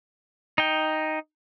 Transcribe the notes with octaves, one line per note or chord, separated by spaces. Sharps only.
D#4 G5